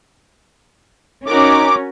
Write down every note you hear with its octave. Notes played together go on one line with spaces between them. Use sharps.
C#4 D#4 F#4 A#4 D6